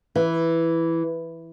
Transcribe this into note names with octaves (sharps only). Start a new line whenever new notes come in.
E3